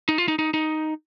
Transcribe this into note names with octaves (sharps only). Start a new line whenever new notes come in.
D#4
F4
D#4
D#4
D#4